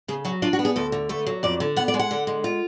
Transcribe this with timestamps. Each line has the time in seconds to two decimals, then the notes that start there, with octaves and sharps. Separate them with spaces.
0.08 C#3 G#4
0.25 F#3 F#4
0.42 D4 F4
0.53 F#4
0.59 B3
0.65 G#4
0.76 D2 A4
0.92 D3
1.09 A3 B4
1.27 F#3
1.43 F2 D5
1.60 D3
1.76 B3 F#5
1.88 D5
1.94 G#3
1.99 F#5
2.11 D3
2.27 G#3
2.44 F4